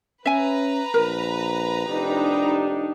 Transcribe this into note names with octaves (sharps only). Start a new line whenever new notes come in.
C#4 B4 E5 G#5 A#5
A#1 A#4
F1 D4 D#4 G4